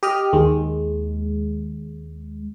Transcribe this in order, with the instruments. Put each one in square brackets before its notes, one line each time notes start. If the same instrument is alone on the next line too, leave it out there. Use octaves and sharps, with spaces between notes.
[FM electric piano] G4 D#5 F6
D#2 G#3